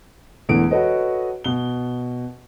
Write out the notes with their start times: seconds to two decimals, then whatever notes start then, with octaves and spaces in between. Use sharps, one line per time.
0.49 E1 E2 E3 A3 B3 D7
0.71 F#4 A4 B4 C#5 D#5
1.44 B2 G7